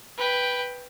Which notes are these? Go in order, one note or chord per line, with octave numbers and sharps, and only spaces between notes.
B4 G5